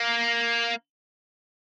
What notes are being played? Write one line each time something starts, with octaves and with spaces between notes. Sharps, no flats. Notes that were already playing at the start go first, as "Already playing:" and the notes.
Already playing: A#3